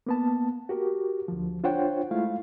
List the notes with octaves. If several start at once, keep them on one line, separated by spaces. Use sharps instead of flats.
A#3 B3 A5
F#4 G4 A#4
D2 F3
D4 F4 C5 C#5 F#5 G5
G#3 A3 E4 F4 F5